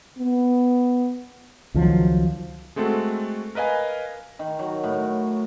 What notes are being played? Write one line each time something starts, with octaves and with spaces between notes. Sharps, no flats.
B3
C#2 D#3 F3 F#3
G#3 A3 C4 F#4 A4
A#4 B4 D#5 F5 G#5
D#3
F#3
A2